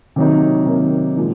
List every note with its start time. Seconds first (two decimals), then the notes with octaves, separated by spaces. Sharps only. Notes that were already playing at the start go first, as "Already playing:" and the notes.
0.16 C3 D#3 F#3 A#3 D#4
0.66 C3 D#3 F#3 A#3 D#4
1.17 A#2 F3 G#3